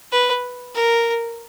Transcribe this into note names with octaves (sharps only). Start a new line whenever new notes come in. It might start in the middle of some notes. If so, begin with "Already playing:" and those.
B4
A#4